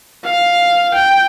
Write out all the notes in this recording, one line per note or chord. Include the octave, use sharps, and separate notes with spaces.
F5
G5